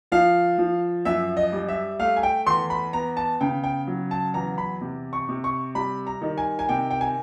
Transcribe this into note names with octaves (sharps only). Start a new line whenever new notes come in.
F3 F5
F3
F#2 E5
D#5
G3
E5
A3 F5
G#5
G5
E2 C6
B5
B3 A#5
A5
C#3 G5
G5
F#3
A5
E2 A#5
B5
C3
C#6
C3
C#6
G3 B5
A#5
D#3
G#5
G#5
C3 G5
G5
G#5